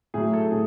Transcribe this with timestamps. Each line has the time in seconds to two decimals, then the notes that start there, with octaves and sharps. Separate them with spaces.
0.14 A2 F#3 G#4
0.33 A4
0.51 A2 G#4